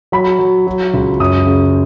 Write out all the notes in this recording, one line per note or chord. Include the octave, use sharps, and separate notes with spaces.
F#3 B5
F#3
F#3
C#2
F#2 D#6
C#3